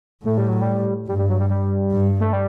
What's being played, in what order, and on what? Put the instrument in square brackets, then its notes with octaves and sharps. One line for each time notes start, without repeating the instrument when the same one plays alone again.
[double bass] A2 [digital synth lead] A3
[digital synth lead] G3
F#3
G3
[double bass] G2 [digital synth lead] G3
[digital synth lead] G3
F#3
G3
G3
[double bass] G2
[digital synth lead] A3
G3